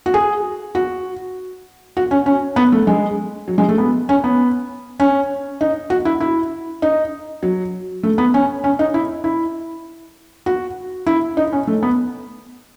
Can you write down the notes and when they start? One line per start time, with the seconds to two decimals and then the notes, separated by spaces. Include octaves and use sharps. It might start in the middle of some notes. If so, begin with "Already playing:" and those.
0.06 F#4
0.14 G#4
0.75 F#4
1.97 F#4
2.11 C#4
2.26 C#4
2.56 B3
2.72 A3
2.87 G#3
3.48 F#3
3.58 G#3
3.69 A3
3.78 B3
4.09 C#4
4.24 B3
5.00 C#4
5.61 D#4
5.90 F#4
6.05 E4
6.20 E4
6.82 D#4
7.43 F#3
8.03 A3
8.18 B3
8.34 C#4
8.64 C#4
8.79 D#4
8.94 E4
9.24 E4
10.46 F#4
11.07 E4
11.37 D#4
11.53 C#4
11.67 A3
11.83 B3